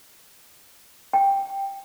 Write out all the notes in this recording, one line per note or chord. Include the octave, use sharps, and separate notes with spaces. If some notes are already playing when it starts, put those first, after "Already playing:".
G5